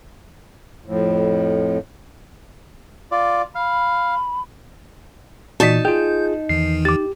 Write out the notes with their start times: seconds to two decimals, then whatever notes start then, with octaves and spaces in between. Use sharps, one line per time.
0.85 F2 A2
3.11 F4 D5
3.55 F5 B5
5.60 A#2 E3 D#4 F#4 D5 A5 B6
5.85 F4 G#4 G5 G6
6.49 E2 D#3 E3 C7
6.85 G4 D6 A6